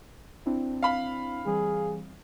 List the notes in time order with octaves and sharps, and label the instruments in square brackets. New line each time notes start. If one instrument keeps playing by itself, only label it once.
[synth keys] C4 D4 E4
[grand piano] F5 B5
[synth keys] E3 G3 C4 [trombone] G#4